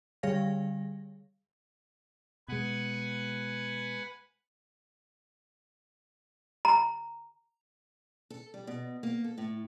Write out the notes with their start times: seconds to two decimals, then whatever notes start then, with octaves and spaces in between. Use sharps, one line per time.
0.23 D3 G3 G#4 C#5 F5 A#6
2.48 B2 G#3 B4 F#5 G#5
6.65 A#5
8.30 A4
8.54 G3
8.67 B2
9.03 A#3
9.24 A4
9.38 A2